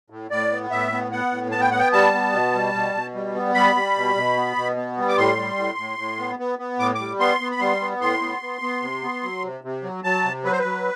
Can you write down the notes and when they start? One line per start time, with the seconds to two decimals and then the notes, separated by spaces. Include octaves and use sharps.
0.10 A2
0.31 A2 D5
0.51 B3
0.71 A2 E5
0.92 B3
1.12 B3 F#5
1.32 A2
1.52 B3 A5
1.61 G5
1.71 B3 F#5
1.79 G5
1.93 G3 A5
2.13 B3
2.33 B2
2.54 G3
2.74 B2
2.94 B2
3.15 G3
3.35 B3
3.54 G3 B5
3.75 G3
3.96 B2
4.16 B2
4.37 B3
4.56 B2
4.76 B3
4.98 G3
5.09 D6
5.18 A2 C6
5.37 G3
5.58 A2
5.78 A2
5.99 A2
6.19 B3
6.39 B3
6.59 B3
6.79 A2 D6
6.95 D6
7.00 G3
7.20 B3 C6
7.40 B3
7.52 B5
7.60 G3 C6
7.81 B3
8.01 A2 C6
8.21 B3
8.42 B3
8.61 B3
8.82 C3
9.03 B3
9.23 F#3
9.44 C3
9.64 C3
9.83 F#3
10.04 F#3 A5
10.24 C3
10.44 F#3 B4
10.52 C5
10.59 B4
10.65 F#3